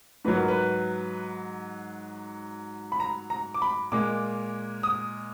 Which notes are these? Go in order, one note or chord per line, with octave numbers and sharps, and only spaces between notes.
G#2 F#3 B4
A#4
B4
B5
A#5
A#5
D6
B5
A#2 G#3 D6
D#6